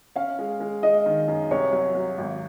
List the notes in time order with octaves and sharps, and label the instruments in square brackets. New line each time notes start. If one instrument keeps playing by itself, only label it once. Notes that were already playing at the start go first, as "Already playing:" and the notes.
[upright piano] C#4 [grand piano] F5
[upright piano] G#3
G#3
[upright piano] G#3 [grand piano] D#5
[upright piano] D#3
F#2
[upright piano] C2 [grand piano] C#5
[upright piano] F#3
F#3
G#1